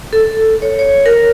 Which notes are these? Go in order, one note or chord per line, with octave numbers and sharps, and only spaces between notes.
A4
C#5
C#5
A#4